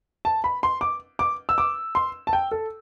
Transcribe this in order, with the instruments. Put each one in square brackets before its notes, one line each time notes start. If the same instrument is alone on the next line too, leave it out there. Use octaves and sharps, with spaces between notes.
[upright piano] A5
B5
C6
D6
D6
E6
D6
C6
A5
G5
A4